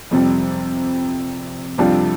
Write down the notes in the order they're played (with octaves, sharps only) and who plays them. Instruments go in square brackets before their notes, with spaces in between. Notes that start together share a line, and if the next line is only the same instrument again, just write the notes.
[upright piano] F2 C3 G3
F2 C3 G3 D4 F4